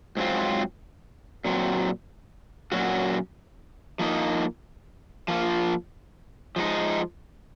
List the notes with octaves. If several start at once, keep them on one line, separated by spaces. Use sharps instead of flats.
G#2 F#3 C4 F4
A#2 F#3 C4
A#2 F#3 C#4 F#4
F3 A#3 D#4
F3 A#3 F4
F3 G#3 D#4